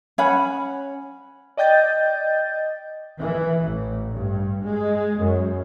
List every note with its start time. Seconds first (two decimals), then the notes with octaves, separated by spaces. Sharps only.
0.18 C#4 F#5 B5
1.57 D5 D#5 G5 G6 A6
3.19 E3
3.64 A1
4.13 G2
4.64 G#3
5.21 F#2